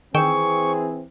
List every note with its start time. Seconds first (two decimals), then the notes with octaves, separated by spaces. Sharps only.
0.14 D#3 E3 C4 G#4 G5 C#6 E6